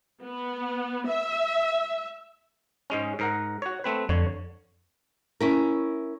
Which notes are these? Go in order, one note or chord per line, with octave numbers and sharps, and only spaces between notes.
B3
E5
G#2 G#3 C#4
G#2 A#4 F#5
F#4 C#5
A3 C4 B4
F2 D3 C#5
C#4 E4 A#4